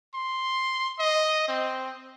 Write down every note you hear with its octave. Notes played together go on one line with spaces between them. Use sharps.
C6
D#5
C4